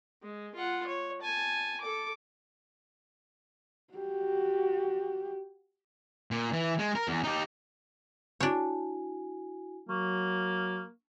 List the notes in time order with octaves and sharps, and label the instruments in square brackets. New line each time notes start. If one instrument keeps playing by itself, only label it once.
[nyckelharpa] G#3
F4 F#5
C#5
G#5 A5
A4 D6
[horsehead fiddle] F#4 G4
[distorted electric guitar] A#2
E3
G#3
A#4
E2
D#4 G4
[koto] D4 C#5 [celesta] E4 F#4 G#5
[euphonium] F#3 [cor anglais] A#3 [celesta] C#6